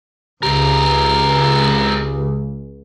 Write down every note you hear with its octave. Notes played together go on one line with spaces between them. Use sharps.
C#2 C4 G4 A#4